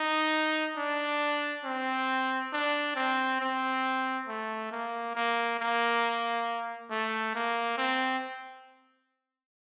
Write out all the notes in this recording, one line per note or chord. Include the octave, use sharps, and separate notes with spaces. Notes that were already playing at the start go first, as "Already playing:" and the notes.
Already playing: D#4
D4
C4
D4
C4
C4
A3
A#3
A#3
A#3
A3
A#3
C4